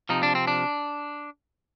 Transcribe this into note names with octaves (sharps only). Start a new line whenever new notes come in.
C3 F3 D#4
D4
C4
D4